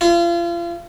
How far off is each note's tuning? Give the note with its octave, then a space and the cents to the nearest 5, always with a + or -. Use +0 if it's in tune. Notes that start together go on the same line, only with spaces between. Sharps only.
F4 -35